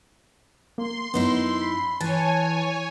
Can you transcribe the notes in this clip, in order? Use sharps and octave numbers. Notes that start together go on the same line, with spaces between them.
A#3 C6
F#2 B3 D#4 E4
B5
E3 C#5 G#5 A5